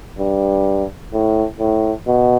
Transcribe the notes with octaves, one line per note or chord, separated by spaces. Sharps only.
G2
A2
A2
B2